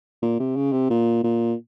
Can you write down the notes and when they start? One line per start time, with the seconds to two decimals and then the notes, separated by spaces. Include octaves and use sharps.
0.22 A#2
0.40 C3
0.56 C#3
0.72 C3
0.90 A#2
1.23 A#2